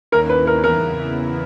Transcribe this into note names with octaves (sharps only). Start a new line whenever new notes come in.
D#2 D#3 A#3 C#4 E4 A#4
B4
A#4
E2 C#3 E3 B3 E4 A#4